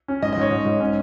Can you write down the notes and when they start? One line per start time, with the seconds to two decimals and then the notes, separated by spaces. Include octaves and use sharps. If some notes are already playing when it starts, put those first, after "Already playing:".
0.08 C#4
0.22 G#2 D#5
0.33 D#5
0.37 G#2 C#5
0.51 G#2
0.66 G#2
0.80 C#4